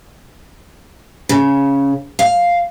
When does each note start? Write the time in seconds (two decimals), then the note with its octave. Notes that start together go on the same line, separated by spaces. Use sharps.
1.29 C#3
2.19 F5